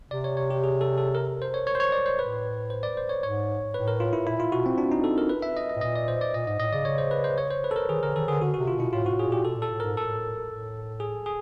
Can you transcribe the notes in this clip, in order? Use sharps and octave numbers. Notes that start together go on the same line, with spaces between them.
C3 D5
C#5
C#5
G4
G#4
A4
A4
A#4
C5
C#5
C#5
C5
C#5
D5
C5
A2 B4
C5
D5
C5
C#5
G#2 C#5
A2 B4
A#4
F4
E4
A#2 E4
F4
B2 F#4
C4
D4
D#4
A4
A#4
B4
E5
D#5
D#5
A2
A#2 D#5
D5
C5
D5
A#2 D#5
G#2 D#5
A2 D#5
C#3 D5
C#3 C#5
C5
B4
C5
C#5
C5
B4
A4
A#4
D#3 G#4
D3 A#4
D#3 A4
D3 G#4
D3 F#4
F#4
C3
F4
B2 E4
A2 F4
G#2 F#4
A2
G#4
A#2 G4
B2 A4
A#2 A4
A2
G#2 A#4
A2 A4
A2
G#4
G#4